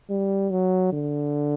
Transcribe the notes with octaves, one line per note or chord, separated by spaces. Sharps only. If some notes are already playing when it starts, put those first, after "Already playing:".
G3
F#3
D3